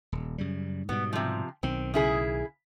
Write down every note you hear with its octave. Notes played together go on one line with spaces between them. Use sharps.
D#1
F#2 C#3 G3
G#2 B2 G3 B3
C3 F3
B1 D#3 C4
C#3 E4 G#4